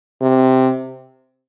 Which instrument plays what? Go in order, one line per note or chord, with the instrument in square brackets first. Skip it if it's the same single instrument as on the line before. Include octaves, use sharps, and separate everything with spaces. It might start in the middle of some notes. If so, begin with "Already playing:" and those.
[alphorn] C3